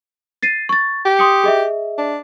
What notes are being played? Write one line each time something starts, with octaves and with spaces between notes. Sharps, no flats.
A6 C7 D#7
C#6 A6
G4
C6 D#6 C#7
G#4 D#5 E5
D4